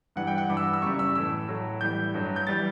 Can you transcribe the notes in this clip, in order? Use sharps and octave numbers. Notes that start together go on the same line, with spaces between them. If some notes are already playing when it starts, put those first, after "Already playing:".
G2 E3 G3 F#5
G5
F#5
G2 E3 G3 D6
E6
E6
F#2 C#3 G3 C#6
E6
A2 E3 A3 E6
A2 F#3 A3
A2 E3 G3 G6
G2 F#3 A3
G6
E3 G3 A6